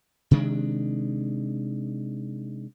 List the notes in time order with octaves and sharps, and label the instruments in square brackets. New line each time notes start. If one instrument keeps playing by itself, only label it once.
[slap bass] C3 D#3 G#3 D4